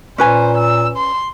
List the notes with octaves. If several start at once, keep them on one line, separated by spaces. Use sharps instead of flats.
A#2 C#4 B4 C5 G#5
E6
C6